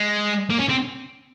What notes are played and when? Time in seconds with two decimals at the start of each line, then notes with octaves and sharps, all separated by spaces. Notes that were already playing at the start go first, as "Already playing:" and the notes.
Already playing: G#3
0.50 A#3
0.59 C#4
0.69 C4